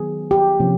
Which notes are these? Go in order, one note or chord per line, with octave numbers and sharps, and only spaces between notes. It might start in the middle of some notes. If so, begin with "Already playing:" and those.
Already playing: D#3 F#3 B3 G#4
G4
C3 F3 A#3 C#4